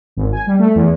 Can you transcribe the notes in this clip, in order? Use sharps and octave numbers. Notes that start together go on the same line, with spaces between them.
G#1
G#5
G3
A3
E2